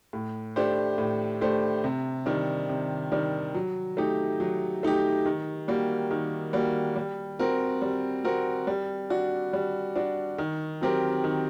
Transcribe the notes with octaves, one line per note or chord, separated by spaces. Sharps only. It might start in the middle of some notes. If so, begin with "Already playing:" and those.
A2
A3 D4 G4 C5
A2
A3 D4 G4 C5
C3
D#3 G3 D4
C3
D#3 G3 D4
F#3
A3 D#4 G4
F#3
A3 D#4 G4
D#3
G3 A#3 F#4
D#3
G3 A#3 F#4
G3
C4 F#4 A#4
G3
C4 F#4 A#4
G3
D4 F#4
G3
D4 F#4
D#3
F#3 C4 G4 A#4
D#3